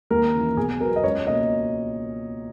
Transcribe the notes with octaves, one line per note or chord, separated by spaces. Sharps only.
D#2 A#4
C#3 E3
B1 G#4
B2 F#3 B3 A#4
D#5
C#2 C#5
B2 A#3 D#5